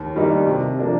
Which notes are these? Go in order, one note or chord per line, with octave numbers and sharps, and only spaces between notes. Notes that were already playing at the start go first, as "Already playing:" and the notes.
Already playing: D#2
D#3 G3 A#3 D#4
C3
F3 A#3 D4